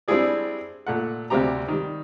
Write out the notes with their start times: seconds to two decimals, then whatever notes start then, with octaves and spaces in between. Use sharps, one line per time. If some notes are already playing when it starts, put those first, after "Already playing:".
0.08 G3 C4 D4 E4 G#4 D5
0.87 A#2 A3 F#5
1.30 D2 C3 G3 C4 G4 A#5
1.68 D#3 G3